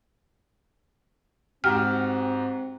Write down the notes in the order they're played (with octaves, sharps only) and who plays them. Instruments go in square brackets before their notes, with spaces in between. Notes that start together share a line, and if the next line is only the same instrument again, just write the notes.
[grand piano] G#2 F#4 G4 [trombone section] C4 [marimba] F6